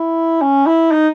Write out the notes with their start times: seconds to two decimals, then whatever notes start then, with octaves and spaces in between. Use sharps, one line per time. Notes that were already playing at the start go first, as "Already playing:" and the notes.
Already playing: E4
0.42 C#4
0.67 E4
0.92 D#4